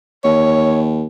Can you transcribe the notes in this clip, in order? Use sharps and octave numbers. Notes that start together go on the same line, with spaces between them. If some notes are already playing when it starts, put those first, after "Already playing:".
D#2 C#5